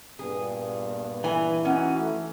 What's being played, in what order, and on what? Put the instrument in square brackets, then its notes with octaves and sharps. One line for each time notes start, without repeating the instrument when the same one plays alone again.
[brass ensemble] G2 A#2 B3 [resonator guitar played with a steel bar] G#4
[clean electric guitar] E3 [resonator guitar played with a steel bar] G#5
[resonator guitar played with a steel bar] C#4 [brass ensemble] D#4 F#4 F#5
[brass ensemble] A3